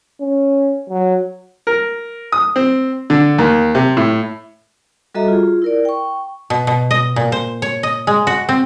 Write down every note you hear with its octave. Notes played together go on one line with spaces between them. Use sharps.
C#4
F#3
A#4
D#6
C4
D3
D#2
C3
A2
G3 F#4 A4 D#5 E5 A#5
F4 G#4
E4 A#4 D5
G5 C#6
B2
B2
D#5
A#2
C5
C#5
D#5
G#3
F#4
C4